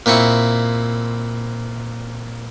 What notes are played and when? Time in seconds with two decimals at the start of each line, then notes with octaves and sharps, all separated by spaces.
0.06 A#2 C4 E4 C#6